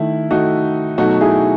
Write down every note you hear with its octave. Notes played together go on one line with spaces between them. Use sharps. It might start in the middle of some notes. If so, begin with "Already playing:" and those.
Already playing: D#3 A3 E4
D#3 A3 D#4 F#4
B2 F#3 A3 D#4 F#4
E4 G#4